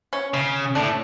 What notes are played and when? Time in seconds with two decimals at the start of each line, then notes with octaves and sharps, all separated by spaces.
0.13 C#4
0.34 C#3 C#4
0.75 A2 D4